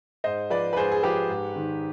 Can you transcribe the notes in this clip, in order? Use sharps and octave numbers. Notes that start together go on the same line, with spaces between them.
G#2 C5 D#5
F3 B4 D5
B4
G#2 G#4 C5
G#4
F3 G4 B4
G#2
D#3